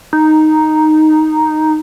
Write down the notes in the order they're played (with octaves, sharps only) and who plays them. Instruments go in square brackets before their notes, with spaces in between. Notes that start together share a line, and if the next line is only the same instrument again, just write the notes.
[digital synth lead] D#4